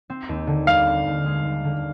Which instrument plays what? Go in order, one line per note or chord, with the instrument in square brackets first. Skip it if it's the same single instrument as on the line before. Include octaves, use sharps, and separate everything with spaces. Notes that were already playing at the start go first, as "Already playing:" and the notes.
[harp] C4
D#2
D3
[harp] G3 [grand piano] F5
[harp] C4
D#2
G#3
D#2
D3